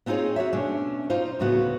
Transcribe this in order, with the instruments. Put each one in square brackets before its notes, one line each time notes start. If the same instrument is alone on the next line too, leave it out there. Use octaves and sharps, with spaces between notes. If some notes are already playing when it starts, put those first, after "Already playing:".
[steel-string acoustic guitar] B3 C4 D#4 F4 G#4 C#5
F#4 G4 C#5 E5
B2 A3 C#4 D4
D#4 F4 C5
D2 A2 C#3 B3 F#4